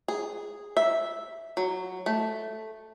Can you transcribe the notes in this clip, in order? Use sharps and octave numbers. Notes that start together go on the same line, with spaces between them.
G#4
E5
F#3
A3